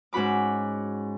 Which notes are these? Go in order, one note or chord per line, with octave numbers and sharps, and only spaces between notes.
G#2 C#4 F#4 B5 D6